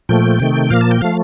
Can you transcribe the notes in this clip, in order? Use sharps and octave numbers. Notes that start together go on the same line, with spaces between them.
A#2 F3 A3 G5
C3 D#3 A3
A#2 F3 A#3 F5
A5
G5
F3 A3 F5